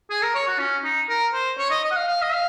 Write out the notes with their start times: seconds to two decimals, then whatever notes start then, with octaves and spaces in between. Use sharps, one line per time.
0.10 G#4
0.22 A#4
0.35 C#5
0.47 F#4
0.59 C#4
0.84 D#4
1.09 A#4
1.33 C5
1.58 C#5
1.71 D#5
1.84 D#5
1.91 F#5
1.96 F5
2.08 F5
2.22 D#5
2.33 F5